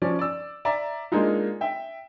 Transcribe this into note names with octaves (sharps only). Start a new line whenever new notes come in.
F3 C#4 D5
D5 E6
D5 E5 A#5
G#3 A#3 D4 D#4 F4
E5 G5